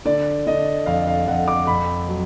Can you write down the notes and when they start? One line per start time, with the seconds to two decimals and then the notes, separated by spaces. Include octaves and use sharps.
0.05 D3 D5
0.47 D3 D#5
0.86 F2 F5
1.07 F5
1.27 F2 F#5
1.48 D6
1.67 F2 B5
2.08 F#3